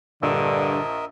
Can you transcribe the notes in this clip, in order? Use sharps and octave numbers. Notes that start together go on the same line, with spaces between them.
A#1 G2 D3 A#4 D#5 E5 E6